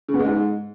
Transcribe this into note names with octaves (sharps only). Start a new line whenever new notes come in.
C#3
B3
G#3
G#2